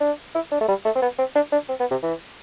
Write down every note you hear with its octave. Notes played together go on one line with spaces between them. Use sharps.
D4
E4
D4
A3
G3
A3
C4
B3
C4
D4
D4
C4
B3
C3
E3